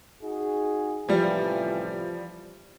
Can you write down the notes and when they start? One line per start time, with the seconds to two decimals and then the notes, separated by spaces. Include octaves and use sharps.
0.22 D#4 F#4 G#4
1.09 A1 C3 E3 F3 G3